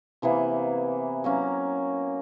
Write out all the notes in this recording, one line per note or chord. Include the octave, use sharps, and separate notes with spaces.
C3 E3 A#3 B3
F#3 A#3 C#4